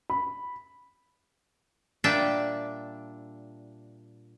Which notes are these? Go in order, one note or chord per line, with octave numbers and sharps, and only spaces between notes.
B5
A#2 G3 D4 E5 G5 A5